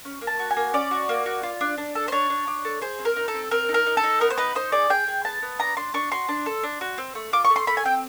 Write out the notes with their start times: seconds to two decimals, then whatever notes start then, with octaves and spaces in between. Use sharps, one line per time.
0.05 C#4
0.21 A#3
0.27 A5
0.39 F#4
0.51 G#5
0.57 A#3
0.74 C#4 D5
0.91 F#4
1.09 A#3
1.26 F#4
1.43 F4
1.61 D4
1.78 D4
1.95 A4
2.08 C5
2.12 D4 C#5
2.30 D4
2.47 D4
2.65 A4
2.81 G#4 C5
2.99 C4
3.05 A#4
3.16 D#4
3.28 A4
3.34 C4
3.51 C4 A#4
3.69 D#4
3.74 A#4
3.86 D#4
3.97 A4
4.03 D#4
4.20 B3 A#4
4.30 C5
4.38 D#4 B4
4.55 D#4 C5
4.72 G#4 D5
4.90 G#4 G5
5.07 G#4
5.24 B3 A5
5.42 B3
5.59 D4 A#5
5.77 D4 C6
5.94 D4 C#6
6.11 F#4 C6
6.29 D4
6.46 A4
6.63 D4
6.81 F#4
6.98 C4
7.15 A3
7.33 F4 D6
7.44 C#6
7.50 A3
7.56 C6
7.67 A3 B5
7.77 G#5
7.85 C4 G5